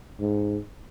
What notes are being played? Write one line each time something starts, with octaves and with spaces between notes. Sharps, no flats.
G#2